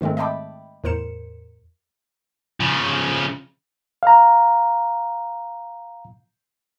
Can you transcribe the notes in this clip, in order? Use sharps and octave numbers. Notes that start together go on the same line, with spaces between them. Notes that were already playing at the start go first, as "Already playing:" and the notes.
G#2 D#3 G#3 A3 C4
D#5 E5 G5 A5 B5 D6
E2 A2 A#4 C5 C#7 E7
C#3 F3
F5 A#5